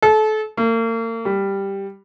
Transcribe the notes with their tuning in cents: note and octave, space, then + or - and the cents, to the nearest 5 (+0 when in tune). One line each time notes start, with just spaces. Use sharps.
A4 -30
A#3 -40
G3 +5